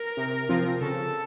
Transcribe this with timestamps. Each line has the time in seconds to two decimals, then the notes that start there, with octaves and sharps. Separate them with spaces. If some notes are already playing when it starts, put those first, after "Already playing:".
Already playing: A#4
0.17 C3
0.49 F3 C4 F4
0.81 C#3 A4